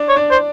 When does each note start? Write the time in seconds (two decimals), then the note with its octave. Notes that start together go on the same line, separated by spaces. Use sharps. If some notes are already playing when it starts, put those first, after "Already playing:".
Already playing: D4 D5
0.09 C#5
0.16 D4 D5
0.31 C5